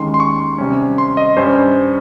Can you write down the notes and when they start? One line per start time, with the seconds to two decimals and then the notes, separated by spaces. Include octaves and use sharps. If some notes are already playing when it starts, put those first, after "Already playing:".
Already playing: D#2 D#3 G#3 C#4 C6
0.14 C6
0.20 C#6
0.58 C3 G3 C#4
0.98 C6
1.17 D#5
1.37 G2 G3 C#4 C5